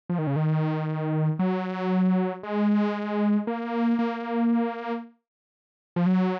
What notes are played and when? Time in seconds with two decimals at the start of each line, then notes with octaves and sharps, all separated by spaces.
0.10 F3
0.18 D#3
0.27 C#3
0.36 D#3
1.39 F#3
2.43 G#3
3.47 A#3
3.99 A#3
5.96 F3
6.06 F#3